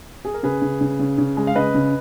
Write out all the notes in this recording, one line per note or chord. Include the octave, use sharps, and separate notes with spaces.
G#4
A#4
C#3 G#4 B4
C#3
C#3
C#3
C#3
G#3
F5
C#3 B4 D#5
C#3